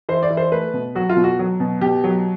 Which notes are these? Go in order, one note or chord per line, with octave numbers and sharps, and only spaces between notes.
E3 C5
D5
E3
C5
A3 B4
B2
F#3 F#4
F4
B2
F#4
F#3
B2
B2 G4
F#3